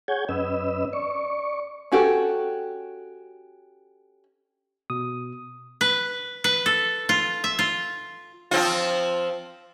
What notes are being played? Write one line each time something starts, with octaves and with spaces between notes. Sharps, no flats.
G#4 C#5 F#5 G6 G#6
F#2 C#4 B4 D#5 E6
D5 C#6
C#4 F#4 G4 A4
B2 D#6
B4
B4
A4
F4
E5
F4
F3 C4 F4